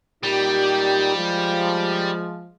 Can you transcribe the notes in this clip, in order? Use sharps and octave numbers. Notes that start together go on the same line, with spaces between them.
A#2 G3 D#4 G4
F3 G#3